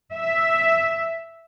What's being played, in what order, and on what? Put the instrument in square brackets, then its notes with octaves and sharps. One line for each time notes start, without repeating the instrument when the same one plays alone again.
[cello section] E5